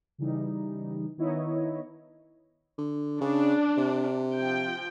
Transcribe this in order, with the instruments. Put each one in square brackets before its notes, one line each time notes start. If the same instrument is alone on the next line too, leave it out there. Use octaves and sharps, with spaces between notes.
[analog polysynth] C#3 E3 G3 D#4
D#3 B3 D#4 E4 C#5 D#5
[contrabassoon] D3
[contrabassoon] C#3 [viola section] D4
[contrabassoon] C3
[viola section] F3 G5